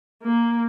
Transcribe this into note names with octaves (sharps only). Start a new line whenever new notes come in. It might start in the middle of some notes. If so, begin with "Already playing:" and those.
A#3